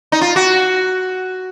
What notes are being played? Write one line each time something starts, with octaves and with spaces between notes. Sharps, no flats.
D#4
F4
F#4